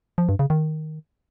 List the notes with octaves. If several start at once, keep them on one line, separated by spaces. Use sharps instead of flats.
F3
G2
C#3
D#3